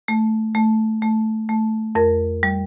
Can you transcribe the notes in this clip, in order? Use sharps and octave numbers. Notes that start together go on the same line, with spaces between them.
A3
A3
A3
A3
F2 A#4
G3